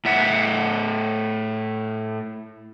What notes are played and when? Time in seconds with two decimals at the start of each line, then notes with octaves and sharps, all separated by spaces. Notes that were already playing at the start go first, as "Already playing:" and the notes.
0.05 A2 E5 F#5